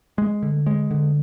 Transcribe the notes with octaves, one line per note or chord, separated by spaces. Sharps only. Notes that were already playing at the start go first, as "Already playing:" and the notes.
G#3
D3
G#3
D3